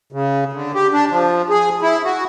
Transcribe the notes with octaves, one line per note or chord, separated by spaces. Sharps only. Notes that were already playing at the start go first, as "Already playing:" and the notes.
C#3
D3
G4
D4
F3
G#4
E4
F#4